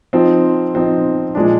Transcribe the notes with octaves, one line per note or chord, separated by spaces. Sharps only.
F3 C4 D#4
F3 C4 D#4
A#2 F3 G#3 D4